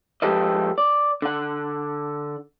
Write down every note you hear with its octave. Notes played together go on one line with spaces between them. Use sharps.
F3 G#3 G4 A4 B4 D#5
D5
D3 F#5